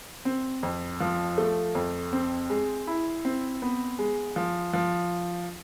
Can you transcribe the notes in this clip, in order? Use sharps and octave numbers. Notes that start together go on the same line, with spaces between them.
C4
F2
F3
A3
F2
C4
G#3
E4
C4
B3
G#3
F3
F3